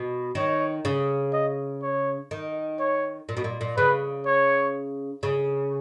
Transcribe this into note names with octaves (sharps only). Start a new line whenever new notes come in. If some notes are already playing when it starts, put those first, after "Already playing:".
Already playing: B2
D#3 C#5
C#3
D#5
C#5
D#3
C#5
A#2
B2
A#2
A#2
C#3 B4
C#5
C#3